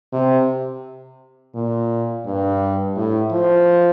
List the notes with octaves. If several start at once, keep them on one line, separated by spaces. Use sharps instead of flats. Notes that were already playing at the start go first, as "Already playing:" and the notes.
C3
A#2
G2
A2
F3